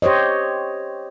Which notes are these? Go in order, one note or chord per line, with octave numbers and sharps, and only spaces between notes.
G4 C5 C#5 D#5